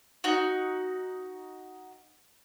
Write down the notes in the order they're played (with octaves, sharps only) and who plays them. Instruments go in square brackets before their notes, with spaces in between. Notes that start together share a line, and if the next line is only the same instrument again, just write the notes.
[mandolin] D#4 F#4